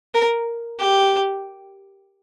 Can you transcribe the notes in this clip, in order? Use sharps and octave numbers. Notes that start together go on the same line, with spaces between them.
A#4
G4